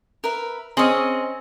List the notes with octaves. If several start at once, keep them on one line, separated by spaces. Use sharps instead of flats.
A#4 B4 E5
C4 C#4 G#4 D#5